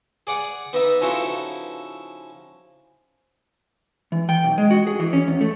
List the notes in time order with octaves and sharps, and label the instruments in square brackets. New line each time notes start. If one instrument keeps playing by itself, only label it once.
[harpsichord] G#4 D5 F#5 D#6
B3 D#4 B4 D#5 E5
C#3 F3 D#4 E4 F#4 A4
[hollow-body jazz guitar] E3
G5
B1
G#3
F#4
G#4
E3
C#4
E2
A3